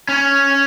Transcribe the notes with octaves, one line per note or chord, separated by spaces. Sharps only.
C#4